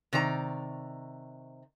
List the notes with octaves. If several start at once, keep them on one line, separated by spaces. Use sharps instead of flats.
C3 D#3 D5 A#5